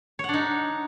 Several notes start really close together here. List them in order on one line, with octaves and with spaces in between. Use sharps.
C#5 F#5 D4 D#4